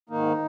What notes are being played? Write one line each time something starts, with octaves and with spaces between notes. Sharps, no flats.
G#2 D#3 A#3 D#4